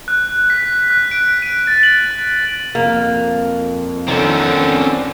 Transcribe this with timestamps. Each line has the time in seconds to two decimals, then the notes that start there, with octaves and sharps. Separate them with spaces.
0.08 F#6
0.50 B6
0.90 F#6
1.11 D7
1.42 D#7
1.67 A6
1.83 F#7
2.75 F2 A#3
4.08 D3 D#3 C4 C#4